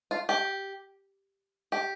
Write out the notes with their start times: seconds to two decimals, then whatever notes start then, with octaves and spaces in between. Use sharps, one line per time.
0.11 F4
0.29 G4
1.72 G4